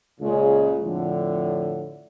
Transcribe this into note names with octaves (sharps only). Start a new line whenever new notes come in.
C#2 A#2 C#3 G#3
F2 A2 D3